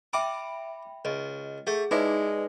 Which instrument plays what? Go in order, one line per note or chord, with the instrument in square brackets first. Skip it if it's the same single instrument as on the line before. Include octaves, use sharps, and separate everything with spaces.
[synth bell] E5 G5 B5 [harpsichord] D6
[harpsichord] C#2 [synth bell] D#5
[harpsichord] A3 [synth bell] G#4
[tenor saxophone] G#3 [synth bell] D#4 B4 D5 [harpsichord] E4